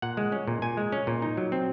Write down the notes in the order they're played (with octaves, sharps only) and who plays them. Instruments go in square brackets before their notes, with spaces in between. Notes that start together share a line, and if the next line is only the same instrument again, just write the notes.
[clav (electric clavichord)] A#2 F#5
G#3
C#4
A#2
A#2 G#5
G#3
C#4
A#2
D#4
F#3
C4